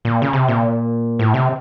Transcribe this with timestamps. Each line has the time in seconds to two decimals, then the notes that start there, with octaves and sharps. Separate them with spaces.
0.05 A#2
0.22 C#3
0.33 C3
0.48 A#2
1.19 A2
1.34 C3